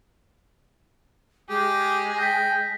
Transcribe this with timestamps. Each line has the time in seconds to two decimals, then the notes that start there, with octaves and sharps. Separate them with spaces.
1.49 G#3 G4 G#4
2.19 G5 A#6 B6